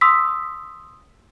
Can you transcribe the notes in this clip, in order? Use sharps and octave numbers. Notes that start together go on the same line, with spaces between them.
C6 D#6 E6 B6